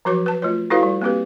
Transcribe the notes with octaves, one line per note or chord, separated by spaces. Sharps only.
F3 F#3 F#4 C#5 D6
B4 A5
A3 F4 C#5
E4 F#4 A4 B4 C#5 F5
G3
A#3 C4 G4 B4